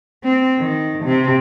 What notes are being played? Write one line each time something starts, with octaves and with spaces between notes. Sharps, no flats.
C4
D#3
C3